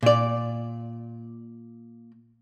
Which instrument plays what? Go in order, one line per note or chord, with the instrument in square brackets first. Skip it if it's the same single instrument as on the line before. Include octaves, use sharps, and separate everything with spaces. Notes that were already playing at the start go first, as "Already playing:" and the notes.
[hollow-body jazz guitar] A#2 D5